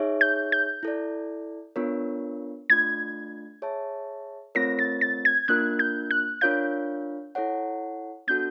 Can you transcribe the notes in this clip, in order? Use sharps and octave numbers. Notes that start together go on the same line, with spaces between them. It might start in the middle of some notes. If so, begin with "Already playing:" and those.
Already playing: D#4 G#4 C#5 E5
G6
G6
E4 A4 D5
B3 D4 F4 A#4 C#5
A3 D4 F4 G#6
G#4 C#5 E5 A5
A3 C4 F4 A#4 C#5 A#6
A6
A6
G#6
A#3 D4 F4 A#4 F#6
G6
F#6
D4 F4 A#4 C#5 F5 G6
E4 A4 C#5 F#5
B3 D4 F#4 A4 G6